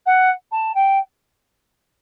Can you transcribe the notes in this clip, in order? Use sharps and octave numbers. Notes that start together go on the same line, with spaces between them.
F#5
A5
G5